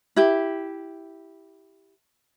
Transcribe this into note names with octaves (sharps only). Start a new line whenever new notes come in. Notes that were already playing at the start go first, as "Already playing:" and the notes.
E4 G4